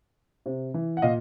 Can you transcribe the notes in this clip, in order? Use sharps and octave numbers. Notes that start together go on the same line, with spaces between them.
C3
E3
F#5
A#2 D#5 F5